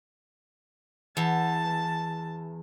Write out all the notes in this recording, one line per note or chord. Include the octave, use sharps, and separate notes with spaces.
E2 A5